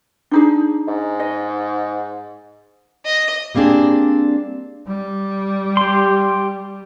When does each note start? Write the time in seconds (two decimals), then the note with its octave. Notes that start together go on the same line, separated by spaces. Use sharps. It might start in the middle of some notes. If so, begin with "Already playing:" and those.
0.31 D4 D#4 G#4
0.88 G#2
1.20 D#5
3.05 D#5
3.55 G3 A#3 C4 D4 G#4
4.87 G3
5.77 G4 C6